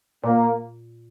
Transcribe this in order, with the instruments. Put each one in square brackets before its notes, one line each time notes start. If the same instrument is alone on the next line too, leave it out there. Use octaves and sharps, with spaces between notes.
[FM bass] A#2 [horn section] A#3